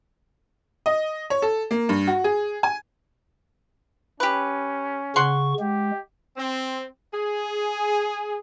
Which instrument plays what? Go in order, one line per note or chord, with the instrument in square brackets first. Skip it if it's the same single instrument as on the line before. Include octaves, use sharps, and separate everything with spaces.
[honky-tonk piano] D#5
C#5
A4
A#3
G2
F#4
G#4
G#5
[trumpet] C#4 [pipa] G4 B4
[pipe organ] C#3 C#6 [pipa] F#5 C6
[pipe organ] G#3 [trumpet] G4
[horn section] C4
G#4